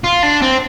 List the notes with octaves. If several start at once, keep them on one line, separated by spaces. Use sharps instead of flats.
F4
D4
C4